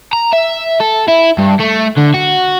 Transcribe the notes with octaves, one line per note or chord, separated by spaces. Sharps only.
A#5
E5
A4
E4
G2
A3
D3
F#4